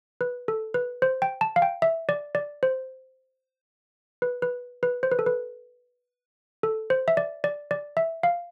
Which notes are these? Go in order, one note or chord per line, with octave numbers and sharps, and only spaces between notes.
B4
A4
B4
C5
G5
A5
F5
G5
E5
D5
D5
C5
B4
B4
B4
C5
B4
A4
B4
A4
C5
E5
D5
D5
D5
E5
F5